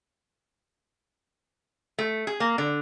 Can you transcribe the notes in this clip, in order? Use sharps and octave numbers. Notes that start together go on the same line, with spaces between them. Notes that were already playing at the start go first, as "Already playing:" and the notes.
A3
G#4
A#3
D3